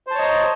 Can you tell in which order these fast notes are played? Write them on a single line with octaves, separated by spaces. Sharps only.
C5 A5 C#5 D#5 A#5